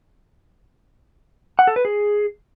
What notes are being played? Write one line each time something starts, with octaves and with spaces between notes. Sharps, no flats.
F#5
A4
B4
G#4